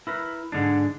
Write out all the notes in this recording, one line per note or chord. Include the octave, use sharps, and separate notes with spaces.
E4 A#4 B4
G#2 D3 G#3 D4